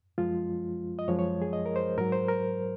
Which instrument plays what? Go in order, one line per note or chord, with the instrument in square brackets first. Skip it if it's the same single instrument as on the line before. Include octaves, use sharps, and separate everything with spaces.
[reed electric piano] F#2 F3 G#3 F4
D#5
F#2 F3 G#3 C#5
C#5
G#4
D#5
A#4
C5
G#2 F#3 A#4
C5
A#4